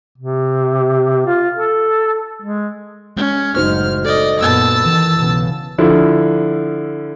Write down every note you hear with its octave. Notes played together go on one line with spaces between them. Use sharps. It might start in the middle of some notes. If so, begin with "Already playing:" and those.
C3
F4
A4
G#3
G#3 C#4
F#1 A2 G#3 D#4 F#4 C5 F6
A4 D5 D#5
F#2 A#2 B3 A5 E6
D#3 E3
B1 C#3 B3
D3 F3 E4